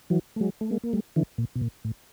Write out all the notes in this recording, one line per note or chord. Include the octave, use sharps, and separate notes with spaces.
E3 F#3
A3
F#3 G#3
A3
G#3 A#3
A#3
G3 A3
D3 E3
A#2
B2
A#2
A2